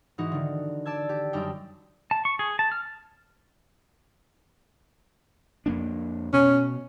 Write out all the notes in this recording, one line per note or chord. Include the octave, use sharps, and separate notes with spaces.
G#2 E3 D#4 F#4
D3 D#3
D5 A5 E6 G#6
G4
F#2 G3 D4 D#4 G5 D7
A5
C#6
G#4
A5
F6
F2 A#3 D4
B2 C#4